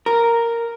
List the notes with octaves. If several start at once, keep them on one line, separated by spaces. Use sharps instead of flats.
A#4